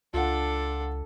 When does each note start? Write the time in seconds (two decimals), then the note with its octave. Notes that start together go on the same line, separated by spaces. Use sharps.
0.14 C#2 D4 F4 A4 F#5